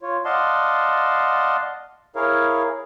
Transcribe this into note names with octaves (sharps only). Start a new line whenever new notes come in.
F4 C#5
D5 D#5 F5 F#5 A5 C6
E4 G#4 A#4 C#5 F5